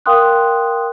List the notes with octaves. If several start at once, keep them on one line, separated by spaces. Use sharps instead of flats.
A#4 F5 G5 C6 D#6 F#6